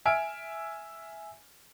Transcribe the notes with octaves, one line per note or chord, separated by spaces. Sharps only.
E5 G#5 E6 F6 D7